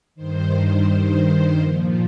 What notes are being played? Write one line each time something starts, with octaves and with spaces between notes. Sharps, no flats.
G2 D#3 C5
C5
C5
A#2 F3